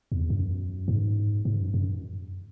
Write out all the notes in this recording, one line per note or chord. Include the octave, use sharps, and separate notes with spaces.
E2
F#2
G#2
G#2
F#2
F#2